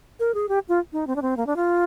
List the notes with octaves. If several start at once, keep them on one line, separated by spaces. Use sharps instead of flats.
A#4
G#4
G4
F4
D#4
C4
D4
C4
A#3
D4
F4